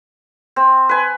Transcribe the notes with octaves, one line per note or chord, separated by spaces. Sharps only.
C4
B4 G#5